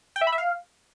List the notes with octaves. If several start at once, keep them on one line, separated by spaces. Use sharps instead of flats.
G5
E5
B5
E5
F5